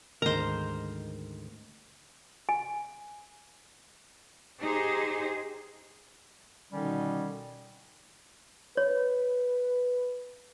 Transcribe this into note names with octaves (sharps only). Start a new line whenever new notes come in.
D2 G#2 D#3 A#4 C5 D#5 A#5
G#5
D#4 G4 G#4 C5
B2 D3 D#3 G3 C#4 D#4
B4 C#5